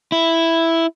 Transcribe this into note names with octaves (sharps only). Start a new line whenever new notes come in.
E4